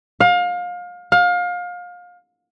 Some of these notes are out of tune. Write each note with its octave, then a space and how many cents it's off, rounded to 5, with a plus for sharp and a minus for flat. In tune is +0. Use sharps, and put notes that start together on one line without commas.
F5 +30
F5 +30